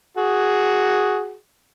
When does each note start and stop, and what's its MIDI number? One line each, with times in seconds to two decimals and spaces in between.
0.17 1.34 66
0.17 1.34 68